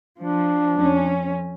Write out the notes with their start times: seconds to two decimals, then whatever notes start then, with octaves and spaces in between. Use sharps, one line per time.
0.19 F3 D4
0.77 F2 C#4